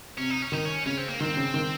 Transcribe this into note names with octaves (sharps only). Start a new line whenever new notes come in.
C3 C#4
D#4
C#4
D#3 D#4
C#4
C#3 C#4
C4
A#3
D#3 C4
C#3
D#3